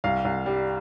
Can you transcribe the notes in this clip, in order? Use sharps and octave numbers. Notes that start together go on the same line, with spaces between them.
C2 F5
C2
G3